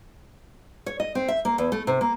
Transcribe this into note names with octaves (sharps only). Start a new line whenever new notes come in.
C#5
D#5
C4
E5
A#3
E2
A3
C3
A#3